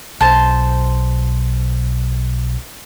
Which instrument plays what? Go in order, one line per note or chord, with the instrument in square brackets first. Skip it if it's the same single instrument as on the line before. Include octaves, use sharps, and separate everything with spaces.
[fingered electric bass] B1 [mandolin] C5 A5